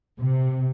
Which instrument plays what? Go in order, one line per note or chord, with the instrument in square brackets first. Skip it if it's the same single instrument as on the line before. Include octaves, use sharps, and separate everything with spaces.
[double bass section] C3